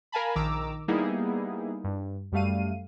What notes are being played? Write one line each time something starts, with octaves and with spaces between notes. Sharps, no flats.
A#4 F5 G#5 A5 B5
A#1 D#3 A#5 D6 E6
G3 A#3 B3 D#4 E4 G#4
G2
F#2 G3 A3 F5 D#7